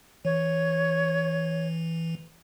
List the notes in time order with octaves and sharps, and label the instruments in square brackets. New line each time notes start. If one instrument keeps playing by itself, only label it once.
[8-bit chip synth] E3 [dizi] C#5